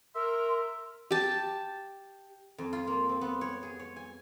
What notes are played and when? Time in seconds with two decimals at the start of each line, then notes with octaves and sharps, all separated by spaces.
0.15 A#4 E5 C6
1.11 G4 A5
2.58 F2
2.73 F4
2.87 A#3
3.09 C4
3.21 B3
3.41 C#5
3.63 G#4
3.79 C#5
3.96 G#5